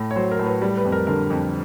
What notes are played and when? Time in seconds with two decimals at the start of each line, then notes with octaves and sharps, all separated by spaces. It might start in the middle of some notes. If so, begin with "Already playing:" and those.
Already playing: A2 A3
0.11 C#5
0.16 F#3 C5
0.31 A#4
0.39 A2
0.46 B4
0.62 G3
0.77 B4
0.85 F2
0.92 A#4
1.07 D3 A#4
1.30 F2